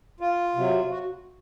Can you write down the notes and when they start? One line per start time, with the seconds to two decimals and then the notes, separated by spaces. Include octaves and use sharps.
0.20 F4
0.56 C3 F#3
0.91 F#4